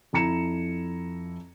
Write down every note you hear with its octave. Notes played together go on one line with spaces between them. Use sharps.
F2 E4 A#5 C#7 E7